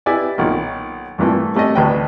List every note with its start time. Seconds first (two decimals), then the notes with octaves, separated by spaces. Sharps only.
0.06 E4 G4 B4 D5 G#5
0.38 B1 A#2 D#3
1.18 G2 A#2 E3 A3
1.55 G3 A3 C#4 D5 D#5
1.75 A1 D2 B4 D#5 G5